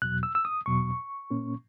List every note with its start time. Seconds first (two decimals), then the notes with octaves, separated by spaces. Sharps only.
0.02 E2 B2 F#3 F#6
0.23 E6
0.35 E6
0.45 D#6
0.66 E2 B2 F#3 C#6
1.31 A#2 A#3 C#4